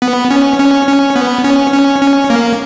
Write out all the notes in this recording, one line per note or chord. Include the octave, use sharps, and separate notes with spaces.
B3
C#4
C#4
C#4
B3
C#4
C#4
C#4
A#3